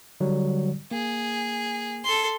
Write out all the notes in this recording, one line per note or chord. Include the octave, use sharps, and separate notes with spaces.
D3 F#3 G3
A#3 G#4
A4 C6